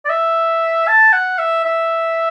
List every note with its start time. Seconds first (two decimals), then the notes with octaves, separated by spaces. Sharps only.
0.05 D5
0.10 E5
0.88 A5
1.13 F#5
1.38 E5
1.64 E5